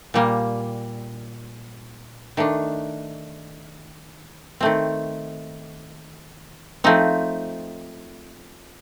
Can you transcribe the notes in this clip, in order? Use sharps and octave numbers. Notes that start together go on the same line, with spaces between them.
A#2 G3 A#3
D#3 A3 D4
D#3 A3 C4
F3 A3 C4 D#4